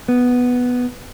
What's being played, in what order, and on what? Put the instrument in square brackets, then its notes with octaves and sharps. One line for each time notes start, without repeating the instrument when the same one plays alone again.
[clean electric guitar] B3